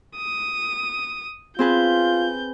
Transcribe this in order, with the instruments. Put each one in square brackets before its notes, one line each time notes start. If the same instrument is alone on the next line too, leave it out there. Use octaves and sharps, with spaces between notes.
[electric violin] D#6
[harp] C4 G#4 B4 [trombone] F4 [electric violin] G6